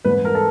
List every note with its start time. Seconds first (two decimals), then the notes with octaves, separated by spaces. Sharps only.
0.05 G#2 E3 G3 C4 B4
0.25 A#4
0.35 A4